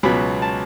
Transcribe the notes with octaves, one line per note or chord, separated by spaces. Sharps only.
C#2 B2 F#3 B3 B5
A5